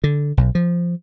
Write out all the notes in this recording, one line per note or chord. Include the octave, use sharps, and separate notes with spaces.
D3
B1
F3